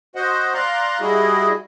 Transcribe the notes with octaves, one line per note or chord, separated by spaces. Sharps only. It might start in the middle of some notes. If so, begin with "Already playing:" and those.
F#4 C5 D#5 F#5
D5 F5 A#5 C6 F#6
G3 E4 F#4 G#4 D#5